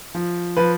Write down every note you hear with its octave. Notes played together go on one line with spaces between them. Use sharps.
F3
F3 B4